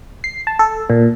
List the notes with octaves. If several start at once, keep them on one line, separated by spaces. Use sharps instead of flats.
C7
A5
A4
A#2